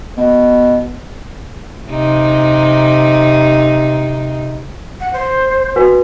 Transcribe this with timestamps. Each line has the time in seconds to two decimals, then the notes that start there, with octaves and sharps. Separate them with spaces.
0.17 B2
1.88 C3 D#4
5.00 F#5
5.13 C5
5.76 F#4 B4 G#5